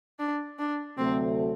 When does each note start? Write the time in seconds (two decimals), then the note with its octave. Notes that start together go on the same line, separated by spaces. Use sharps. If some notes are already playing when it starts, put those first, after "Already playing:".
0.19 D4
0.59 D4
0.98 D2 C3 F#3 A3 C4